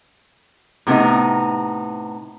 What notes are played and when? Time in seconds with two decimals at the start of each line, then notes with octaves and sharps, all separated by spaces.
0.87 A2 C3 B3 D#4